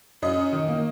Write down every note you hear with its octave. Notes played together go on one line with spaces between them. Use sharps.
F#2 D#5
C#4
D#3
A#3